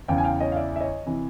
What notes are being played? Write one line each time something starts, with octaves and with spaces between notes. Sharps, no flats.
E2 C#3 E3 F5 G5
G#5
F5 G5
C#5 D#5
F5
D5 E5
E5
C#5 D#5
C3 E3